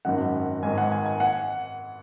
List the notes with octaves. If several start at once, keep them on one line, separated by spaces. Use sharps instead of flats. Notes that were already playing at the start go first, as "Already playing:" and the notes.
G#1 F#2 D#3 F#5
G#1 G#2 D#3 G#5
F#5
G#5
G#5
F#5